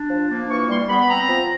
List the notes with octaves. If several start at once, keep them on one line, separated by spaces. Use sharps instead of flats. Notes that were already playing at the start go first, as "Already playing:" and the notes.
Already playing: D4
F3
A#3
E3 C#6
G3 C6
B3 B5
B5
C4 A#5
F3